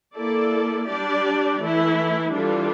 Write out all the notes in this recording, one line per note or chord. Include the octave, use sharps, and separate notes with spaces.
A#3 E4 A4 D5
G3 D4 G4 D5
E3 A3 E4
E3 G3 D4 F4 A4